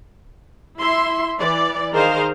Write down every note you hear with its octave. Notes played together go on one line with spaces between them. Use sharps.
E4 E5 C6
E3 D5
D#3 G#4 A#4 C5 D#5 F5